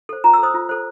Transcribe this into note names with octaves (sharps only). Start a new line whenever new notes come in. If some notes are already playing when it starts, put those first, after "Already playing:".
A4 C5
F4 A#5
E6
A4 C5 D#6
F4
A4 C5